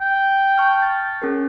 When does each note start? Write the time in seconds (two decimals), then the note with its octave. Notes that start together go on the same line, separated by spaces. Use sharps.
0.01 G5
0.58 A5 C#6 F6
0.82 A6
1.22 C#4 G#4 A#4